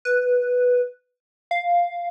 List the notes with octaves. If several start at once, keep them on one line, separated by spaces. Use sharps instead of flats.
B4
F5